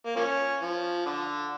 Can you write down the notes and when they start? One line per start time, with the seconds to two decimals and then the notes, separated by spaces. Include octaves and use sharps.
0.06 A#3
0.16 F3 A#3 C#4
0.61 F3
1.06 D3